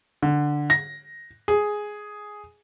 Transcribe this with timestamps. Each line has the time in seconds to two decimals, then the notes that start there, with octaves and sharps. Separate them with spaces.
0.23 D3
0.70 A#6
1.48 G#4